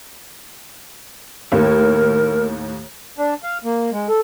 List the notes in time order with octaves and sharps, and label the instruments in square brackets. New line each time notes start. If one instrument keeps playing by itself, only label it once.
[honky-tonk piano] D#2 A2 [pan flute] A#4
[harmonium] D4
F5
A#3
G#3
A4